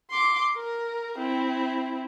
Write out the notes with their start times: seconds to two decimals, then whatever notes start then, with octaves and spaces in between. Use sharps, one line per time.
0.11 C6 D6
0.56 A#4
1.18 C4 E4